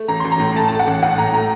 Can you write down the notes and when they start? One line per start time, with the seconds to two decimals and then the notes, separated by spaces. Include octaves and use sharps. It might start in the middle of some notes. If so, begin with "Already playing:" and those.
Already playing: A3
0.08 A1 A#5
0.20 A1 C6
0.32 A#5
0.40 A2
0.55 A3 A5
0.68 A3 A5
0.79 F#5
0.87 A1
1.02 A2 F#5
1.18 A2 A#5
1.34 A3 A#5